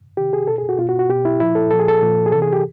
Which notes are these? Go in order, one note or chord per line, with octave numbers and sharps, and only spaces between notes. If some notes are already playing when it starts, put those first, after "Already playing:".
C3 D#3 G4
G#4
B2 A4
G#4
F#4
B2 F4
F#4
F#4
B2 G4
E4
A#2 F3 E4
A4
A#2 F3 A4
G#4
A4
A#2 F3
G#4
C3 E3 A4
G#4
G4